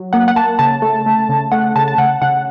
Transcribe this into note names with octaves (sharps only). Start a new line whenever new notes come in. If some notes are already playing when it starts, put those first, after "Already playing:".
Already playing: F#3
A#3 F#5
F#5
A#3 A5
C#3 A5
A3
A3
C#3
A3 F#5
C#3 A5
A5
C#3 F#5
C#3 F#5